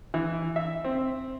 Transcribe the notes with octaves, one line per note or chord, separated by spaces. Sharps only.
E3
E5
C4